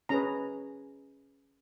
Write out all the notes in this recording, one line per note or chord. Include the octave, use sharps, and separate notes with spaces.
C#4 G#4 B4 A#5